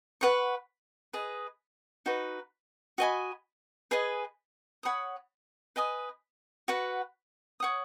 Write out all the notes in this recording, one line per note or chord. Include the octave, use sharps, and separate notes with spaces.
B4 F#5 C#6
G#4 B4 D#5
D#4 F#4 B4
F#4 D#5 G#5 B5
G#4 B4 D#5 G#5
C#5 F#5 B5 D#6
B4 D#5 G#5 D#6
F#4 B4 F#5
C#5 F#5 D#6